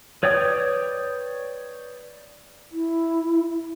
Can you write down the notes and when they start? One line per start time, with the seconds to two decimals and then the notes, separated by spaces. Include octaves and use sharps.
0.23 B4 C#5 D5 G5 D#6
2.72 E4